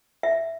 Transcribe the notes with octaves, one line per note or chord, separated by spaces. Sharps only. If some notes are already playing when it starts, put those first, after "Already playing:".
E5